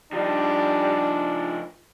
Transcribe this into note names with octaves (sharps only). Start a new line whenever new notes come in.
F3 G3 D4 D#4